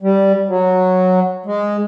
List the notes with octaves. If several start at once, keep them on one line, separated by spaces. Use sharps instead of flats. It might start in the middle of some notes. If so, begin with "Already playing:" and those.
G3
F#3
G#3